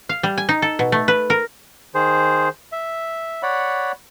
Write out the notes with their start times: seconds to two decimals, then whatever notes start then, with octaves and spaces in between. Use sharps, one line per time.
0.09 F5
0.23 G3
0.37 G#5
0.49 D#4
0.62 A4
0.79 B2
0.92 A3
1.08 B4
1.30 A#4
1.95 D#3 G#4 C5
2.72 E5
3.43 C#5 D5 F#5 B5